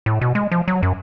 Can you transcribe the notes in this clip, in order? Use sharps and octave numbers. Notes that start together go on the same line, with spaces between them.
A2
B2
G#3
F3
F#3
F#2